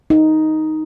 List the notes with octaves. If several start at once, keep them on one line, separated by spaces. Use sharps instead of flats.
D#4